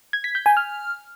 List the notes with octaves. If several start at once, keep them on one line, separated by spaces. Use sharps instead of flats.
G#6
B6
G6
G#5
F6